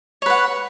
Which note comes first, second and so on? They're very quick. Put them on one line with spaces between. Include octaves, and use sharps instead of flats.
C#5 B4 F#5